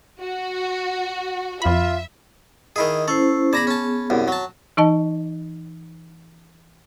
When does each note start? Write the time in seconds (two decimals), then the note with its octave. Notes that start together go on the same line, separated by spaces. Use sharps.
0.20 F#4
1.62 F2 F4 E5 B5
2.76 D#3 E4 G#4 D#5
3.08 C#4 E4 A4 C5
3.53 B3 G#4 D5 A#5 B5
3.67 C#4 A5
4.10 C2 F#2
4.28 F#3 A5
4.77 E3 D#4 D#5 A5